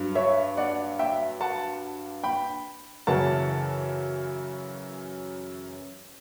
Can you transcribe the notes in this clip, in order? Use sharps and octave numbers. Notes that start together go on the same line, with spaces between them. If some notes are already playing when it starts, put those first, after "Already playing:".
Already playing: G2 F#3
C#5 E5
D5 F#5
E5 G5
F#5 A5
G5 B5
F#2 C#3 E3 F#5 A5